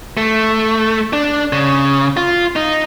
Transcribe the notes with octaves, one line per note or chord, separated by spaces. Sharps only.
A3
D4
C#3
F4
D#4